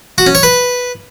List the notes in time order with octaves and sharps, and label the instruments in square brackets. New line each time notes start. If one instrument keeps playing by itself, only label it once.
[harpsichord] F#4
C#4
C#5
B4